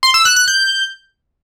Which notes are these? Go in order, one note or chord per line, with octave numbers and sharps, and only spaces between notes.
C6
E6
F#6
F#6
G6